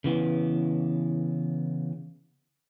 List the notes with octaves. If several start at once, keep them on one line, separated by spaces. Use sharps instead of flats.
C#3 E3 B3